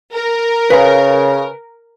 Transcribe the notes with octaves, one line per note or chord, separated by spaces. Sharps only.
A#4
C#3 B4 F5 B5